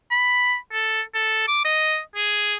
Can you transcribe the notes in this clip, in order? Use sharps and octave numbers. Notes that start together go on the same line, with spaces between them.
B5
A4
A4
D6
D#5
G#4